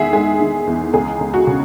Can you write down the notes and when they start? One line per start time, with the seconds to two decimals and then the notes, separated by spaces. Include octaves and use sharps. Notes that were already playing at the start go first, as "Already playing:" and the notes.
Already playing: E2 D#3 G#3 G#4 E5 F#5
0.13 G#3 G#4
0.40 D#3
0.67 E2
0.93 C#2 G#4
1.20 C#2
1.34 F#4
1.47 C#3